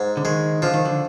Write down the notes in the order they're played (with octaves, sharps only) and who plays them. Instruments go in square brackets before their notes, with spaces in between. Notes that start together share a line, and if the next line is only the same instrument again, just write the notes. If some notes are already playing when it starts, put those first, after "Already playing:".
Already playing: [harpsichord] G#2
[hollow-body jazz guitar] D3
[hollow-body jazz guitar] D#3 [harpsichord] G#3
[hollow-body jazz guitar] D3 [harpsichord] F3
[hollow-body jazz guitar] D#3
D3